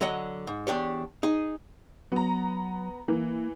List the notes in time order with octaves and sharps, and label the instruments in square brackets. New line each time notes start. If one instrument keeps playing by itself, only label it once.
[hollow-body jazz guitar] D3 F#3 C#5 D#5 F#5
G#2
E2 D4 G4 C#5
D#4 G#4
[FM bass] F#3 [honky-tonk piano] B3 A#5
[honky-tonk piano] E3 [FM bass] A#3